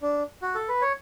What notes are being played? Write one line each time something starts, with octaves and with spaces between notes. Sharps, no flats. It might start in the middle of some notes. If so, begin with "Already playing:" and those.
D4
F#4
A4
B4
C#5